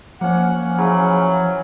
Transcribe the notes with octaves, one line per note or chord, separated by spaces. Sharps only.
F3 A#3 C#4 F#5
C#3 E3 F#3 B5